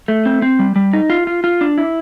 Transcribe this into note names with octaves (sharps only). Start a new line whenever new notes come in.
A3
C4
C4
G3
G3
D#4
F4
F4
F4
D4
E4